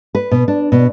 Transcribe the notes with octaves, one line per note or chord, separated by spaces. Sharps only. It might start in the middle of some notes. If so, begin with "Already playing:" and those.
B4
B2
D4
B2